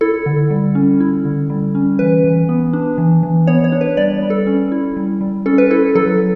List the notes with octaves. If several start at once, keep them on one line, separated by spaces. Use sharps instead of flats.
E4 A4
D3
G3
C#4
E4
D3
G3
C#4
E3 B4
E3
B3
D4
E3
E3
B3 C#5
C#5
D4
B4
G3 D5
G3
A4
C#4
E4
G3
G3
C#4 A4
B4
E4 A4
F#3 A4